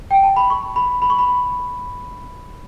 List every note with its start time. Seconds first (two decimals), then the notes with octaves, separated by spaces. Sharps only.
0.11 G5
0.23 A5
0.36 B5
0.50 C#6
0.76 B5
1.02 B5
1.10 C#6
1.19 B5